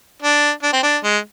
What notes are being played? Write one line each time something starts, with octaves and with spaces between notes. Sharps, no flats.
D4
D4
C4
D4
G#3